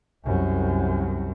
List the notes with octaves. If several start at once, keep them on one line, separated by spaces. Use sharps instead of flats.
C2 F#2